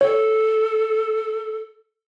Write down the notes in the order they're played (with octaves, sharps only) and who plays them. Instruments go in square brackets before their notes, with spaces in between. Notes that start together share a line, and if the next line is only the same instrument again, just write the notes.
[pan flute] A4 [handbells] C#5